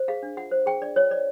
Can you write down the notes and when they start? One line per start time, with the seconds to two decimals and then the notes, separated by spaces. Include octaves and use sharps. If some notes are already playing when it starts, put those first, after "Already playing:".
Already playing: C5
0.08 G#4 F5
0.23 D4
0.37 F4 F#5
0.51 C5
0.66 G#4 G5
0.82 D4 D5
0.96 F4 C#5
1.11 C5 D5